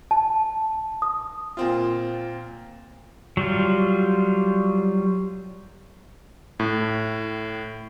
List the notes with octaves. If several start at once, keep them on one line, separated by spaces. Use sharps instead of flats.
A5
D#6
A#2 C4 F4
F#3 G3 F4
A2